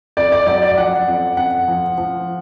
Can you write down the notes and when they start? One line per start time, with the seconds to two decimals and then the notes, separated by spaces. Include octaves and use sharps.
0.17 F2 D5
0.32 D5
0.47 F#3 D5
0.62 D5
0.77 F3 F#5
1.07 F2
1.37 F2 F#5
1.68 F3
1.98 F3